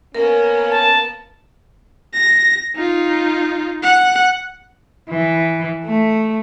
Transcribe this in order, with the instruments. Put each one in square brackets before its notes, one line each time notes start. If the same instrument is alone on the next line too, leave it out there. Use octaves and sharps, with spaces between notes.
[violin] A#3 B3 [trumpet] C#4 [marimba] A#4
[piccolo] A5
[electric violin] A#6
D#4 F4
F#5
[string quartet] E3
A3